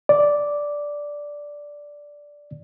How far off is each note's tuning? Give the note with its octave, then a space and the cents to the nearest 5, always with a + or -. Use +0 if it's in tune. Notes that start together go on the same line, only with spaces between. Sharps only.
D5 -5